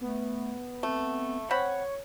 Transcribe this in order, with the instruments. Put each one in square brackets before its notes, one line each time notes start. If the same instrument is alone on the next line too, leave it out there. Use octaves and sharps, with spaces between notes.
[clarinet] A3 [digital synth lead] B3
[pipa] A3 [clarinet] C4
[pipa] C4 F#5 B5 [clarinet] C#5 [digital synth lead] C#6